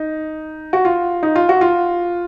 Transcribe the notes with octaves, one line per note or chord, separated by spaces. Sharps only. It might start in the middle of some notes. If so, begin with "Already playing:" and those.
Already playing: D#4
F#4
F4
D#4
F4
F#4
F4